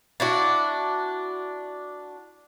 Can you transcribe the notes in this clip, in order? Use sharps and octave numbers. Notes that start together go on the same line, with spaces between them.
D4 E4 F#4